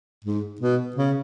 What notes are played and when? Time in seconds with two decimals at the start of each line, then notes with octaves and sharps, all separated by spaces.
0.25 G#2
0.60 B2
0.96 C#3